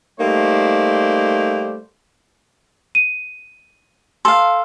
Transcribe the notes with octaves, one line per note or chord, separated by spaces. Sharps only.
G3 A3 A#3 D#4 C5 D5
D#7
A4 F5 C6